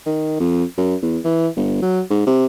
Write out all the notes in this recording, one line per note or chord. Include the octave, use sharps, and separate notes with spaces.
D#3
F2
F#2
E2
E3
G1
F#3
G#2
C3